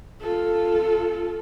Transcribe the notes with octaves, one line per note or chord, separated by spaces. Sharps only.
F4 A4